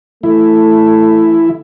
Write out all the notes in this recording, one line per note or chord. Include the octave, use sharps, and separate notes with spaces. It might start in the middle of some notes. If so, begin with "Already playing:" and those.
E3 A3 E4